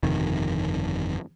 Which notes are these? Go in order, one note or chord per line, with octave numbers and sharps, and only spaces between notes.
G1 F2 C3 D#3